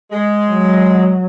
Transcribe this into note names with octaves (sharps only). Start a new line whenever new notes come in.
G#3
F#3